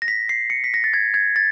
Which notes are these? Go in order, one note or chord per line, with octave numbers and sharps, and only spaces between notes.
A#6
B6
C7
C#7
B6
A#6
A6
G#6
G#6
A6